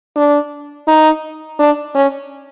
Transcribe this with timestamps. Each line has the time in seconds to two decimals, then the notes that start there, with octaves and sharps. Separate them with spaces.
0.16 D4
0.88 D#4
1.59 D4
1.95 C#4